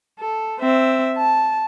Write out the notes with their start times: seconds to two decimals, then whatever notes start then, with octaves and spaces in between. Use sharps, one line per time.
0.20 A4
0.60 C4 E5
1.17 A5